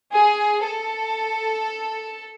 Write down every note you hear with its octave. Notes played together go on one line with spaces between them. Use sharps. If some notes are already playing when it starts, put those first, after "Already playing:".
G#4
A4